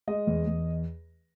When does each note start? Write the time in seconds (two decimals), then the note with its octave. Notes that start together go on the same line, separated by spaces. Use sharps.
0.07 G#3 D#5
0.27 E2
0.47 E2